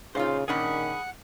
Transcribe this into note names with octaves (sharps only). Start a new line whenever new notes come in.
A#2 C#3 D#4 F4 C5 F5 C6
A#2 D#3 C#4 D4 G#4 F#5 B5 D#6